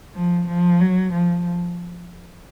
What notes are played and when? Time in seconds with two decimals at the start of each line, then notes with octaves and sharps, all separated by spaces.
0.15 F3
0.48 F3
0.81 F#3
1.13 F3